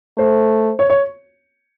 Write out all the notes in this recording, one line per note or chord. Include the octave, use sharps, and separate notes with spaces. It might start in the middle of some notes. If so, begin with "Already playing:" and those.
A3 C5
C#5
C#5